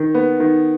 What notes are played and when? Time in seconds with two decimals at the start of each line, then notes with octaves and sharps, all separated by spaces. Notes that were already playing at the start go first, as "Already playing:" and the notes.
Already playing: D#3
0.15 B3
0.40 D#3